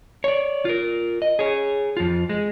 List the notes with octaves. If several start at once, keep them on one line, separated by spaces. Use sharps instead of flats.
C#5 D5
F4 A#4
D#5
G#4 C#5
F2 F4
G#3